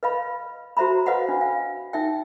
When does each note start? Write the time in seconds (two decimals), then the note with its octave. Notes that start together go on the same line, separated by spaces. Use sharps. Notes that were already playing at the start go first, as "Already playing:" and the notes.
0.03 B4 D#5 F5 B5
0.77 F#4 C5 E5 A#5 B5
1.06 B4 C5 D#5 F5 F#5 B5
1.29 D4
1.41 F5
1.93 D#4 E5 G5